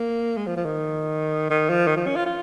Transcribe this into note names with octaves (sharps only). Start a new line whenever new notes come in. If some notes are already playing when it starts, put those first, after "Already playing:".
Already playing: A#3
G#3
F3
F3
D#3
D#3
F3
D#3
F3
C#4
F4
F4